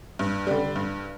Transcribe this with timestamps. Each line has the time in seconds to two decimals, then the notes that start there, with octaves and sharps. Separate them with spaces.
0.19 G2
0.47 D3 G3
0.76 G2